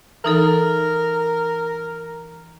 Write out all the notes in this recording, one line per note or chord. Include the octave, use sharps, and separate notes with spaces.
E3 D#4 A4 A#4